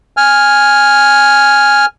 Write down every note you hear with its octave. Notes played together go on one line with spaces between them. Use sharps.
G#5 F6